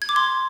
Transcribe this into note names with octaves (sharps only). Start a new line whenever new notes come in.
G#6
D6
C6